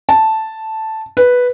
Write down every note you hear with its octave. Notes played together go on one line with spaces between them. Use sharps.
A5
B4